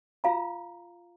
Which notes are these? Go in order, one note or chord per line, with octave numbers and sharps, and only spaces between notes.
F4 F5 A#5